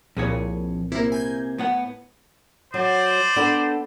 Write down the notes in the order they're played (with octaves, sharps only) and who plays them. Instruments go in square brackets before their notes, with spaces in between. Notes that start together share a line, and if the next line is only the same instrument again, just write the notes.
[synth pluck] C2 A#2 [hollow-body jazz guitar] F2 G#4 C#5
[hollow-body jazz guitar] C3 A#3 [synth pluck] E4
[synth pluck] G#5 G6 G#6
[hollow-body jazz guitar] A2 B3 F#5
[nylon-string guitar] F#3 [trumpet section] C5 D5
[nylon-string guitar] B3 D4 A4